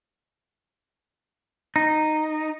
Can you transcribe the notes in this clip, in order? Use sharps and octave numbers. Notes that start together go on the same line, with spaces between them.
D#4